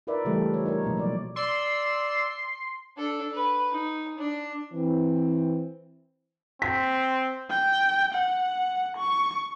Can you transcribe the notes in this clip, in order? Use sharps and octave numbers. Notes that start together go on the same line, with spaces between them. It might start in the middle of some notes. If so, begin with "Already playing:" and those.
D#4 F4 A#4 B4 D5 E5
C#3 E3 G3 A3 G4 A4
G3 F4 C#5
D#4 A#4 C#5
B2 F3 A#3
F#3 D5
D5 C6 E6
D4 A4
B4
D#4
D4
E3 C4
C4 B6
G5
F#5
C#6